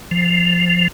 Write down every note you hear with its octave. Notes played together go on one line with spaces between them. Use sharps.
F3